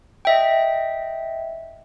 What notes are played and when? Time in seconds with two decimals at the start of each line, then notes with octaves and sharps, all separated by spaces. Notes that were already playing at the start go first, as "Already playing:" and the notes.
0.25 D#5 E5 G5